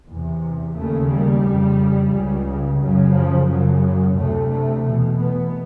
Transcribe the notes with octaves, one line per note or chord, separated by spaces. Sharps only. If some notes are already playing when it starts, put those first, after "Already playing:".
E2 C3
D#2 C#3 A3
G3
F2 C#3
C#2 C#3
F#2 C#3 F#3
F3
F#2 C#3 F#3
D2 C3 A3
A3
E2 B2
B3